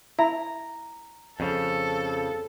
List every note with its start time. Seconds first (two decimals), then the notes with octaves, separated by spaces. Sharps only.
0.19 E4 A#5
1.40 F2 C#3 F3 A4